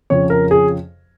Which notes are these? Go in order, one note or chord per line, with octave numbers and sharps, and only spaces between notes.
F2 C#3 F3 C#5
A#4
G#4